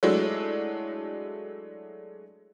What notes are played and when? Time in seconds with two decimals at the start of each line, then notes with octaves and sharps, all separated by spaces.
0.03 F#3 G#3 A3 D4 E4